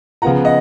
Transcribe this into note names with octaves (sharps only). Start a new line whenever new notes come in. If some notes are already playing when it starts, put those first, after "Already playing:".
C#3 F3 B3 F4 F#5 A#5
D#5 F#5